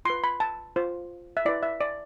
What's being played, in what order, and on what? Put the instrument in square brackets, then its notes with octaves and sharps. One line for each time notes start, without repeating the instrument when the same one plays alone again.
[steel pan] F4 C6
B4
B5
A5
F4 C5
E5
E4 D5
B4
E5
D5